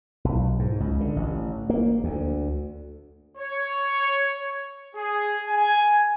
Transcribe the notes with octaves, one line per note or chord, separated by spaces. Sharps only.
B1
G#2
C#2
D3
A1
A#3
D2
C#5
G#4
G#5